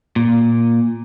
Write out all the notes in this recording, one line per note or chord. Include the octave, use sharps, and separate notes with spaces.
A#2